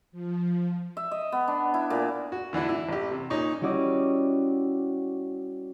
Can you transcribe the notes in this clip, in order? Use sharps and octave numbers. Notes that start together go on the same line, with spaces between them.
F3
E5
D#5
B3
D4
E4
A#2
F#4
D3 E3 D4 E4
E4
A1 G4
C3
A#2 C#4 D#4 C#6
G3 C#4 E4 F#4 D5 D#5